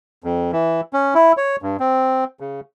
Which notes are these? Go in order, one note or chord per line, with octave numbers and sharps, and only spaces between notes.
F2
E3
C#4
E4
C#5
G2
C4
C#3